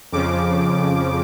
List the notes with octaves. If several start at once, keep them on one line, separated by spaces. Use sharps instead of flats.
F2 C#3 F3 D6